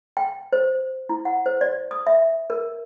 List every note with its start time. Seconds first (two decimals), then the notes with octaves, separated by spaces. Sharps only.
0.17 G5
0.53 C5
1.09 E4
1.25 F#5
1.46 C5
1.61 D5
1.91 D#6
2.07 E5
2.50 A#4